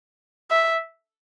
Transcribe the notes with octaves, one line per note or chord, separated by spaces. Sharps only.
E5